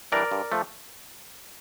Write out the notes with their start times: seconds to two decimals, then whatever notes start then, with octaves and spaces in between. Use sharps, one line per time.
0.12 E3 G3 D4 A#4 D5
0.31 G2
0.52 F3 A3